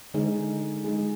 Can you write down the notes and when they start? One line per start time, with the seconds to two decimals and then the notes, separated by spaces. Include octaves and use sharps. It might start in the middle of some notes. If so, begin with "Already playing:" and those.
0.14 D3 G#3 D#4 G#4
0.84 G#3 D#4 G#4